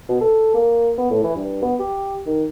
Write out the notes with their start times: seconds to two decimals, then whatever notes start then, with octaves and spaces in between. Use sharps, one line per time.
0.09 B2
0.21 A4
0.54 A#3
0.98 B3
1.10 A2
1.23 E3
1.36 G2
1.62 B3
1.79 G4
2.26 D#3